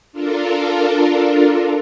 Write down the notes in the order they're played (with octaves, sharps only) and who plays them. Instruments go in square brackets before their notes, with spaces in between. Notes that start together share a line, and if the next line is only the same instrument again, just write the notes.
[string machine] D4 F4 A4 A#4